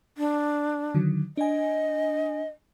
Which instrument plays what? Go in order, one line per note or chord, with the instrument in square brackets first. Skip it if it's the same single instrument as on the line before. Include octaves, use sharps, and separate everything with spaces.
[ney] D4
[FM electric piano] D3 D#3 F#3
[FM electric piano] D4 G#5 [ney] D#5